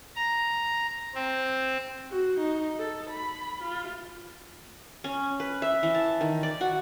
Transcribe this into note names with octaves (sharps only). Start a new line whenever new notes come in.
A#5
C4
F#4
D#4
A4
B5
F4
C#4
B4
E5
E3
A5
D#3
D5
F#4